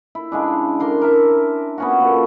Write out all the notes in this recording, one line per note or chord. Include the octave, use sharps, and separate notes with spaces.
E4
C#3 G#3 D4
A#4 C6 D6
A#4 E5
B3 C#4 F#4
A#2 A4